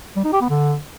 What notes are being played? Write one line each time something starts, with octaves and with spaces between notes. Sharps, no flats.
G3
D#4
G4
B3
D3